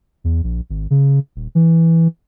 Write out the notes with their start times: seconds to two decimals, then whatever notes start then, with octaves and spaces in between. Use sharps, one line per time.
0.24 E2
0.43 A#1
0.70 G#1
0.90 C#3
1.36 D#1
1.55 E3